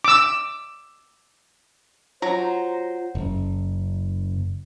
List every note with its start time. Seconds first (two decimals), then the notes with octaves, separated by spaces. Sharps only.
0.04 D6 E6
2.22 F#3 F4 C5 A#5
3.15 F#1